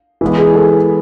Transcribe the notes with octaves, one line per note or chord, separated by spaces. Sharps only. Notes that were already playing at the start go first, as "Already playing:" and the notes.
E3 G#3 B3 E4
G#4
A4